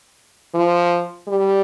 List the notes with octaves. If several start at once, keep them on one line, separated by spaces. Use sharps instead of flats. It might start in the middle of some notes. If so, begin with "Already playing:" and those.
F3
G3